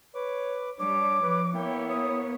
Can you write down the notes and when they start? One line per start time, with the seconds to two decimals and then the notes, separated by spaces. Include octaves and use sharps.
0.15 B4 C#5 D6
0.79 G3 D4 C#5 D6
1.22 F3 B4
1.54 A#3 B3 E4 C#5 G5
1.89 D#6